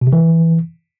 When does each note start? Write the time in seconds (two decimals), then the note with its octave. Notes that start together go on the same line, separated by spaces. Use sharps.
0.01 B2
0.07 C3
0.13 E3